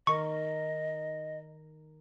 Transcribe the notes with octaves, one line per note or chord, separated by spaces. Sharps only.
D#3 A#4 D#5 C#6